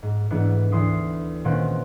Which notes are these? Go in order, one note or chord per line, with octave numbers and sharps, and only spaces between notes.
G#2
G#2 E3 A3 B3 D4 E4
D2 E3 E4 C6 D#6 C7
A#2 D#3 C4 C#4 B4 F#5